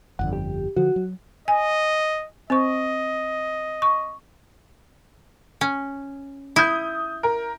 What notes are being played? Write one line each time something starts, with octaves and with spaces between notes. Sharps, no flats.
G1 F2 D3 F#5
G4
D3 F3 F#4
F#3
D#5 G#5
C4 C5 D#5 C#6
C#6
C#4
E4 D#6 G6
A#4